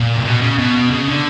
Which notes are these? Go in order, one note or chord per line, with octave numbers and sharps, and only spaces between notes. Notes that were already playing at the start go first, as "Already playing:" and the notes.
Already playing: A#2
C3
B2
C#3
B2
C#3
D3